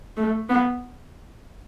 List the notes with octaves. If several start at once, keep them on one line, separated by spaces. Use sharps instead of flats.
A3
B3